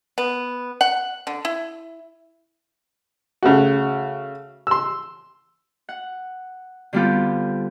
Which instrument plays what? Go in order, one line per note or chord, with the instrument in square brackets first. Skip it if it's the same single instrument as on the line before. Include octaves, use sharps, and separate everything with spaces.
[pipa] B3
F#5
D3
E4
[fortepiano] C#3 A3 F#4
C6 E6
[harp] F#5
D3 G3 B3 C4 F4 G4